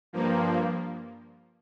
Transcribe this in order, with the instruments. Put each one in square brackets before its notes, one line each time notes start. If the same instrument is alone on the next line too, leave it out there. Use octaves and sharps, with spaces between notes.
[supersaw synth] G2 F3 A#3